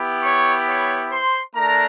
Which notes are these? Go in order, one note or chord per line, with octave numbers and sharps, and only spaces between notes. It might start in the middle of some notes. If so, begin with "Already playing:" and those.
Already playing: B3 E4 G4
C#5 C#6
C#5 C#6
C5 C6
A3 D4 A#4 A#5